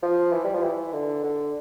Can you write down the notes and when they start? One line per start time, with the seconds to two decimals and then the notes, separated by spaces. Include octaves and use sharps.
0.03 F3
0.32 E3
0.44 G3
0.54 F3
0.63 E3
0.93 D3
1.24 D3